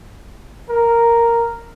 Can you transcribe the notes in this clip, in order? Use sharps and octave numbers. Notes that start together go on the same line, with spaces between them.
A#4